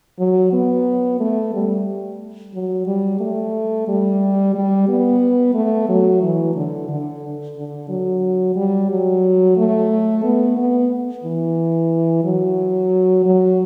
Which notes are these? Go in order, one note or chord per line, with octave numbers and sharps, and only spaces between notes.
F#3
B3
A3
G3
F#3
G3
A3
G3
G3
B3
A3
F#3
E3
D3
D3
D3
F#3
G3
F#3
A3
B3
B3
E3
F#3
F#3